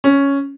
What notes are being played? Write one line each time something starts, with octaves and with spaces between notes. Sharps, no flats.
C#4